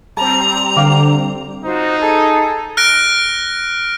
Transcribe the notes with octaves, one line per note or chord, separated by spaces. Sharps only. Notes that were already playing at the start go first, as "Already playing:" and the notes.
G3 C4 A5 A#5
D3 F5 G5 D6
D#4 F4 F#4 C5
G#4 A4
F6 F#6 A#6 D7